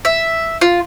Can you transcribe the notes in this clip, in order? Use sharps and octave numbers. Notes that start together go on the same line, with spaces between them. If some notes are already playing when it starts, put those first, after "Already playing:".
E5
F4